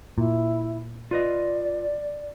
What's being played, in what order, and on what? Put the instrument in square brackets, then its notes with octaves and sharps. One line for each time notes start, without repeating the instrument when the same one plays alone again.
[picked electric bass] A#2 [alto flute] E4
[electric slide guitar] F4 B4 D#5 [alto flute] D5